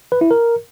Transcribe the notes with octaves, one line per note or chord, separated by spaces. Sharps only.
B4
E4
A#4